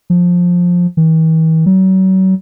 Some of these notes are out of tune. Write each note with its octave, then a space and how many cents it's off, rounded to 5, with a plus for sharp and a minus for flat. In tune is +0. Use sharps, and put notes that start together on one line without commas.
F3 +15
E3 -45
F#3 +35